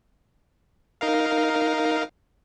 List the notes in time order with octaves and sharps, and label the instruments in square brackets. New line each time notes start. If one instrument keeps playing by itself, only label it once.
[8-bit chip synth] D#4 A#4 F5